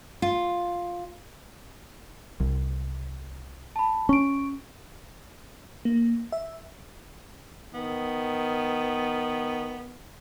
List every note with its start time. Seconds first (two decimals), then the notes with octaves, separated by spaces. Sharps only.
0.22 F4
2.40 C2
3.76 A5 B5
4.09 C#4 C#6 D7
5.85 A#3
6.32 E5
7.74 D#3 B3